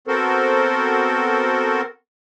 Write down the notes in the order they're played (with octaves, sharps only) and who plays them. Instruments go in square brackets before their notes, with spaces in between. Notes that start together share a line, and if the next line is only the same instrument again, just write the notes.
[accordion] B3 C4 F#4 A4 A#4 C5